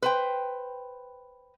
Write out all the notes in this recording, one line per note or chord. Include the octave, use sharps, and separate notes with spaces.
B4 C5 G5